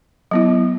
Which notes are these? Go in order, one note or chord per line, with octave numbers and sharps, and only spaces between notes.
F#3 B3 E4